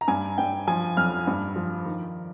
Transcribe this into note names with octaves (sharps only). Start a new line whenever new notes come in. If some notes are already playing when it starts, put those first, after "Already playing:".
A#5
G2 G#5
G2 G5
F3 G#5
F2 F6
G2
F3
D#3